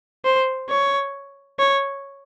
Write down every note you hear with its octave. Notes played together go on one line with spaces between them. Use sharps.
C5
C#5
C#5